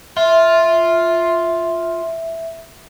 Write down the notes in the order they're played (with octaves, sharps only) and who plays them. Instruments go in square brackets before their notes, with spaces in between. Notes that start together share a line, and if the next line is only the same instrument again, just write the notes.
[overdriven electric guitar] F4 [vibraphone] E5